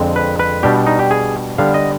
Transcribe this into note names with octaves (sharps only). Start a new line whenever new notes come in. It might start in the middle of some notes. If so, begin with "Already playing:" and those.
Already playing: F2 D3 G#3 C4
B4
B4
B2 G3 D4 G4
D#4
G4
G#4
D3 G3 B3 F5
D#5